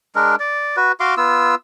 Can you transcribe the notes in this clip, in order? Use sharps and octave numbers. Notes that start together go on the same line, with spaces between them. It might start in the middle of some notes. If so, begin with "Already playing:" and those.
G#3 D4 A#4
D5
F#4 B4
F#4 F5 C6 D6
B3 F4 E6